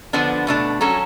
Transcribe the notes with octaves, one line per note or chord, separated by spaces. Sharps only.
D3 F3 B3 D4
B2 A3 D4
F#3 C#4 F#4 A4